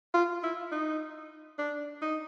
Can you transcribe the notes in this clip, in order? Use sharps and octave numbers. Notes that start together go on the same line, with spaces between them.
F4
E4
D#4
D4
D#4